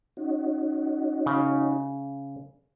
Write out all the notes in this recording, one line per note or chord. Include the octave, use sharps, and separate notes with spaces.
C#4 D#4 F#4
C#3